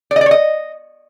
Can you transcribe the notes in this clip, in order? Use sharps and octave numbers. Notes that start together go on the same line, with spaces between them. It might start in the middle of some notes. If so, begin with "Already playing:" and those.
D5
D#5
D5
C#5
D#5